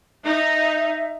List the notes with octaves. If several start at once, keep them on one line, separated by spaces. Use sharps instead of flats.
D#4 E5